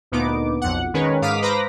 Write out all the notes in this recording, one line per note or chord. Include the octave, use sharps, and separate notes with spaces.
D2 A#2 B3 D#4 D6
B1 F2 F#5
D#3 G#3 C#4 A#4 B4 C#5
G#2 F5 D6 D#6 F6 B6
B4 C5 A#5 B5 D6 A#6